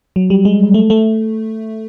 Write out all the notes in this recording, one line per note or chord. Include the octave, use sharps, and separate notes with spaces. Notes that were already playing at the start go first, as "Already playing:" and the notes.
F#3
G3
G#3
A3
A3